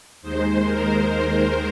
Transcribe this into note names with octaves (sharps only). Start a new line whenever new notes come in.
D#2 D#3 G#3 C5
A#4
C5